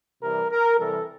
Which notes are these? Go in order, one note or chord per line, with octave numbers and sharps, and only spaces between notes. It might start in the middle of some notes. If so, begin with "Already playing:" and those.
C3 E3 G3 A#4
A#4
C3 E3 G3 A4